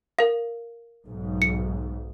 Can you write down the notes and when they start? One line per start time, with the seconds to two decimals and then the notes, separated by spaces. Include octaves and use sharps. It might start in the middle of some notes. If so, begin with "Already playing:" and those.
0.19 A#4 F5
1.06 B1 G#2
1.42 C#7